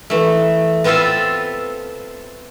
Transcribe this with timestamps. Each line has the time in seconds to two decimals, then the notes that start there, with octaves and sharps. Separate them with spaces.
0.10 E3 A3
0.84 B3 C4 F4 A4 E5 F5